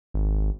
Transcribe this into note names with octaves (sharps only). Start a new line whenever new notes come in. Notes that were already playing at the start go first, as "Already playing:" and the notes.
G#1